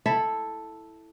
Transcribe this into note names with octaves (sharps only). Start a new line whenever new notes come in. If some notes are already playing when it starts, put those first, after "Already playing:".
E4 A4 E5